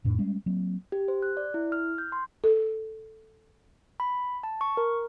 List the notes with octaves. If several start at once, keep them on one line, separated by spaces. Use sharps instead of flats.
F2 A2 D4
G3 G#3 C#4
F#3 A#3 C4
G4
C5
F#6
D5
E4
F6
G6
C6
A4
B5
A5
C#6
A#4